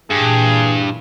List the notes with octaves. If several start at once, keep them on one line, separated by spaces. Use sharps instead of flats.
G2 A#2 E3 G#4